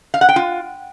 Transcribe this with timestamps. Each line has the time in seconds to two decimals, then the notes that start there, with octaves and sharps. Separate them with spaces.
0.14 F5
0.21 F#5
0.29 G5
0.36 F4